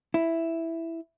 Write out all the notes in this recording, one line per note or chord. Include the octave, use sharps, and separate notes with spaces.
E4